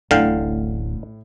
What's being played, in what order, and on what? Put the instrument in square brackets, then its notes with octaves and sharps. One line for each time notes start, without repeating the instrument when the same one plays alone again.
[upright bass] D1 A1 [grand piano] A2 [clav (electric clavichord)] D3 F5 G5